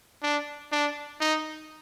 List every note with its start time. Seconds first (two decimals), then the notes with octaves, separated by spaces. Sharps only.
0.23 D4
0.72 D4
1.21 D#4